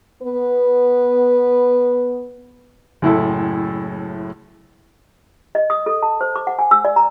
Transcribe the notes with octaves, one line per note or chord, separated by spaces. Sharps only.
B3 B4
F#1 A2 E4 A4
D#5
D#6
A4
A5
C5
D6
F#5
G#5
E6
D5
A#5